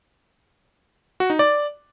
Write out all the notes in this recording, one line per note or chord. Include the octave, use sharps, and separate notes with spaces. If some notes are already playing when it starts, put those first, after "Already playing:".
F#4
D#4
D5